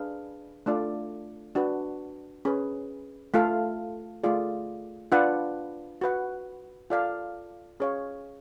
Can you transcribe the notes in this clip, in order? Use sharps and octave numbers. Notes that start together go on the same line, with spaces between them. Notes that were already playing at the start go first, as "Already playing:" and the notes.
Already playing: D4 G#4 B4 F5
A3 D4 F4 A4 D5
D4 F#4 B4
C#4 G#4 B4
A3 F4 A4 F5
A3 F4 G#4 D5
D4 F4 B4 D5 F#5
F#4 B4 F#5
F4 A4 D5 F5
C#4 G#4 C#5 F5